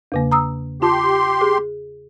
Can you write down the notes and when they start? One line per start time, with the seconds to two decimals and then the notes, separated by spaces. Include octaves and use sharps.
0.12 E2 C#3 A#3
0.32 A#5 D#6 E6
0.82 F4 G4 A5 C6 D6
1.41 G#4